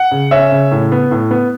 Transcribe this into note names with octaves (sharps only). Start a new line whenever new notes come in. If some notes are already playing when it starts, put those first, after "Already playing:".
Already playing: F#5
C#3
C#4 E5
C#3
A2
B3
A2
B3